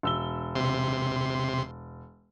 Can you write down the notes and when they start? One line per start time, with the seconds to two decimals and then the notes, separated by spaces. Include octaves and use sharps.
0.03 E1 E6 G7
0.55 C3 C6